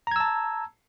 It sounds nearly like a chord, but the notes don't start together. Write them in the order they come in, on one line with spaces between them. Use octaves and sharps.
A#5 G#6 E6 A5